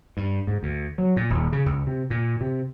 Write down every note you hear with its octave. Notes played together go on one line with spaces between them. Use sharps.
G2
G#2
D2
F#3
A#2
D#1
C#3
C#2
C3
A#2
C3